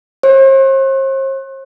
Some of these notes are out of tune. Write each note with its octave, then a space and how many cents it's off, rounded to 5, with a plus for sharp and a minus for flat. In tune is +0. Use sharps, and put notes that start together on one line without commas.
C5 +45